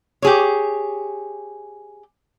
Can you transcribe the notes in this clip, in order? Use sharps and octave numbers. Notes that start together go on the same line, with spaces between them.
G4 G#4 C#5